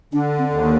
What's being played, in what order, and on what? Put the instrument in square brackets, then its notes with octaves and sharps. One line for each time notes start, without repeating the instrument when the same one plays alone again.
[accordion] D3 [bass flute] D4
[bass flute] C4
[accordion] D#2
[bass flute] A#3